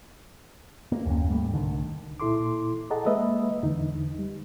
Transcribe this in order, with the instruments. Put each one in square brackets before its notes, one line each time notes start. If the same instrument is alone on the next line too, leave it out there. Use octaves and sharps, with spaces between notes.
[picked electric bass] A#3
F#1 D#2 A#3 C#4
G#2 G3 A3
C2 D3 D#3
[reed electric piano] A#2 E4 A4 C6 D6
G#4 A4 D#5 F#5 A5 A#5
G#3 A#3 B4 D#5 E5
E2 D3 D#4
G3